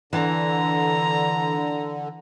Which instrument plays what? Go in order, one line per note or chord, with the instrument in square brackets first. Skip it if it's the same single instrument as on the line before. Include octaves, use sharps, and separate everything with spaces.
[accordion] D3 [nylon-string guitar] E3 [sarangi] A#5